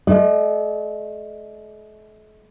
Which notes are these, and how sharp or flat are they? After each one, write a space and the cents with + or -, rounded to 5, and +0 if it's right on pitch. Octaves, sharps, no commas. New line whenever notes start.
A3 -45 D5 +45